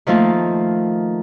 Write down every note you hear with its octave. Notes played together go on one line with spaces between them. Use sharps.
D#3 F3 A3 A#3 F4